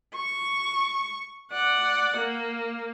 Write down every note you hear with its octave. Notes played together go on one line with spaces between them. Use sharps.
C#6
D5 F#5
A#3